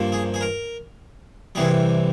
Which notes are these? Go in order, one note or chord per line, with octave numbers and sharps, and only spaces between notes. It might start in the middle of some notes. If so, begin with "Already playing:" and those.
Already playing: G2 F3 A#3
G#4
G#4
A#4
C2 C3 E3 G3 G#4